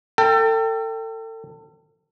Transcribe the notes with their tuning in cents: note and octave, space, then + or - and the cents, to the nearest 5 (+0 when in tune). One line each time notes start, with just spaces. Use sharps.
A4 +35 G5 +0